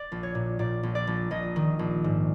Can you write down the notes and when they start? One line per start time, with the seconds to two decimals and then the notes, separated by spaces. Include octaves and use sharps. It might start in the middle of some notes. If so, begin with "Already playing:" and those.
Already playing: D5
0.12 A#1
0.23 C#5
0.35 A#2
0.59 A#2 D5
0.83 A#1
0.95 D5
1.07 A#1
1.31 A#1 D#5
1.56 D#3
1.79 A#1
2.04 G#2